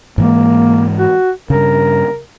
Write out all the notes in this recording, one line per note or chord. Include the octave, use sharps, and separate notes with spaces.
G#2 E3 G#3 A#3
F#4
G2 C#3 A#4